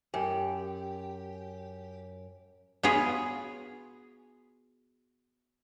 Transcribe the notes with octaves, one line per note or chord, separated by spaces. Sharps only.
F#2 G4
B3 F4 F#4 G#4 C#5